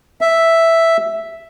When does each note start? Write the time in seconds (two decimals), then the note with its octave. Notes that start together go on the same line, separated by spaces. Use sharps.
0.21 E5